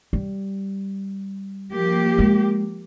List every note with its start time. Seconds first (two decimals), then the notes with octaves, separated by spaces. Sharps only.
0.13 G3
1.73 F3 A#3 G4
2.19 G#3